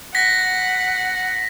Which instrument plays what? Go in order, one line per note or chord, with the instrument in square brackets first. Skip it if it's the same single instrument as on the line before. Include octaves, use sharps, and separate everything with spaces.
[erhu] F#5 [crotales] A#6 B6